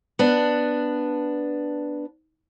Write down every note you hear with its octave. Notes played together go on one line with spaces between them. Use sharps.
B3 D4